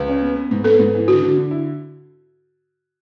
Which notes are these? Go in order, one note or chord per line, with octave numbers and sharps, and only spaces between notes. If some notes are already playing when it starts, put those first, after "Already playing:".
Already playing: C#2 B4
C#4
B3
B3
G#2
B3 A4
G#2
E3
D3 F#4
D3
D3
E4